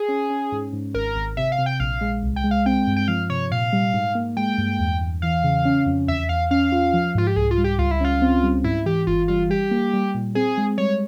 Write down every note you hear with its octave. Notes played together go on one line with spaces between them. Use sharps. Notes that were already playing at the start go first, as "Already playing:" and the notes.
Already playing: G#4
C#4
C#4
G#2
G#2
G#1 A#4
G#1
C3 E5
F5
C3
G5
A#1 F5
G#3
C2
G5
G#3
F5
C4 G5
G2
G5
F3 F5
C3 C#5
A#2 F5
G3
G#2
A#3
G#3 G5
G2
E2
E2
E3 F5
C#3
C#4
F2
E2 E5
E2 F5
C#4 F5
F4
F3
G#2 F4
G4
C2 G#4
F4
G3
G4
C#2 F4
E4
C#4 F4
C4
G3
G#2 E4
E3 G4
G1 F4
G3 F4
G3 G4
A#3
G3
A#2
C4 G#4
G#3
G3 C#5